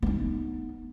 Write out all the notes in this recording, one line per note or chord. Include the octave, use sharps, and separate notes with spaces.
B3 D#4